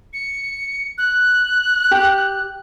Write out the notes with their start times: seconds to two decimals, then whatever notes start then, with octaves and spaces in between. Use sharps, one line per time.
0.13 C#7
0.98 F#6
1.91 G4